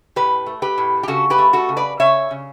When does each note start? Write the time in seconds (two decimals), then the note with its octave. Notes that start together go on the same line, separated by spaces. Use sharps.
0.16 A2 G4 B4
0.46 A3
0.62 G4 B4
0.78 A2
1.03 G4
1.08 C#3 F#4 A4
1.30 G4 B4
1.38 A3
1.53 F#4 A4
1.69 C#3
1.77 B4 D5
2.00 C#3 C#5 E5
2.31 C#3